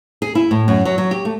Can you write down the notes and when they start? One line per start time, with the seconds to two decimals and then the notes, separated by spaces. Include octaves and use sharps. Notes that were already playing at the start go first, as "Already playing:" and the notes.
0.22 G#4
0.35 E4
0.51 A2
0.68 F#2
0.85 F#3
0.98 F#3
1.11 G4
1.25 A3